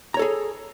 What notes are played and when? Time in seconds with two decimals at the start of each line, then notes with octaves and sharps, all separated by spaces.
0.14 A#5
0.17 C#5
0.19 A4
0.22 G#4